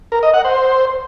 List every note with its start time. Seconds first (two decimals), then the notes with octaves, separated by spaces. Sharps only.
0.12 A#4
0.23 D#5
0.34 F#5
0.45 C5